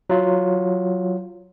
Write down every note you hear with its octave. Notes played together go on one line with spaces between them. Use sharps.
F#3 F4